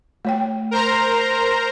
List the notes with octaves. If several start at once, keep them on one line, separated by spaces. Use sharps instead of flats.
A3 C#5 G5
A#4 C5 A#5